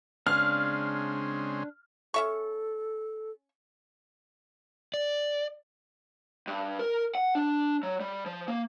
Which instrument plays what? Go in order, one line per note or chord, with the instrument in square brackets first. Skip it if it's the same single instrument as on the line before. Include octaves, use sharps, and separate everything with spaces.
[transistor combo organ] C#3 G#3 C4 [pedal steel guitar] D4 F5 [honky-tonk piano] F6
[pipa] C#4 E5 C#6 [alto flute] A4
[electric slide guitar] D5
[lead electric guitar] G2
A#4
F#5
D4
F#3
G3
F3
A#3